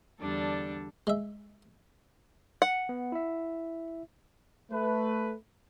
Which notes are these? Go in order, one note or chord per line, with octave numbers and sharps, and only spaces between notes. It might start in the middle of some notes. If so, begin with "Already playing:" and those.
E2 D3 G3 D4 A4
G#3 E5
F#5
B3
E4 E5
A3 B4